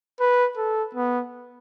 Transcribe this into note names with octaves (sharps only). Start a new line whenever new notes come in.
B4
A4
B3